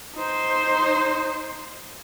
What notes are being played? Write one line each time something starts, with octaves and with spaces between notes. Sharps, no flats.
D#4 C5